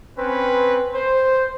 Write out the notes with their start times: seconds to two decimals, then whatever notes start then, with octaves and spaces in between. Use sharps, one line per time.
0.17 C4 C#4 B4
0.94 C5